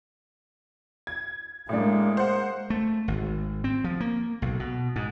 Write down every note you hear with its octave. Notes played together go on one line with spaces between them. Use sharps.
G#6
A2 G#3 A#3 D4
C5 F#5
A3
G#1
C4
F3
A#3
B1
B2
G#2